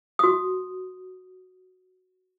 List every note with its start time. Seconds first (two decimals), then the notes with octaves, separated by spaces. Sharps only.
0.19 F#4 D#6